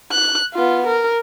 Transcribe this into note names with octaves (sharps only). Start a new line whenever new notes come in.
F#6
B3 F4
A#4